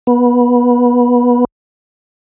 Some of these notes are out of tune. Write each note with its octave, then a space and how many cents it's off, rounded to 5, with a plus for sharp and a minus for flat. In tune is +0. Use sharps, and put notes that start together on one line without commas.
B3 -20